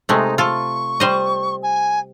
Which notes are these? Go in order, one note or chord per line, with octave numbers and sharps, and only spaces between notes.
C3 G#3 A3 D#4
F4 A4 C#6
G3 C5 D#5
G#5